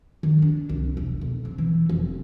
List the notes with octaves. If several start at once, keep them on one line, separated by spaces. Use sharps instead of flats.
D#3
D4
C2
E1
B1
C4
E3
F1